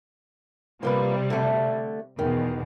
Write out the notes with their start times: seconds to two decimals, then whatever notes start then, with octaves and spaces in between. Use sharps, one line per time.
0.83 C3 F3 G3 A#3 B4
1.30 D3 A3
2.19 E2 B2 D#3